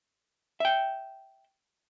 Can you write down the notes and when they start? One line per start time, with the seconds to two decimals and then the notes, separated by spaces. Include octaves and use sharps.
0.60 E5 G5